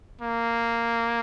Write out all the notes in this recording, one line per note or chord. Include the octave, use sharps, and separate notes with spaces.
A#3